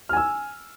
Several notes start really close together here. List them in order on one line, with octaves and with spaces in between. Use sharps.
F6 G#5 E6